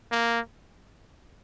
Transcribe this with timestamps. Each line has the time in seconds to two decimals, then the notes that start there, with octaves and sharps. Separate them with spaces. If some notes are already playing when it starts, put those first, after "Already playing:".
0.12 A#3